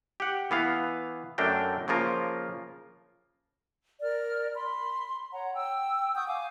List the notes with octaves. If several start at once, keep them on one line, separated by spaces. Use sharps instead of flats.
G4 F#5
E3 B3 F5
F#2 A3 D4 A#4 G5
C#3 F3 A#3 F4 A#4
A#4 D5 F6
B5 C6
C#5 F#5 A#5
G5 E6
F#5 C#6 D#6 G6
F5 G#5 D6